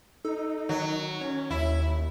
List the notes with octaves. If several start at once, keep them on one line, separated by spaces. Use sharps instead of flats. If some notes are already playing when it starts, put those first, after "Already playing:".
D#4 A4
D#3 F#3
C#4 C#5
D#2 E4